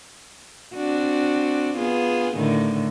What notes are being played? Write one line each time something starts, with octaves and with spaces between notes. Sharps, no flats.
C4 D4 F#4
B3 F4 G#4
A2 D3 D#3